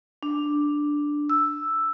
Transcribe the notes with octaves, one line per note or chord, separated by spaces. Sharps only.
D4
E6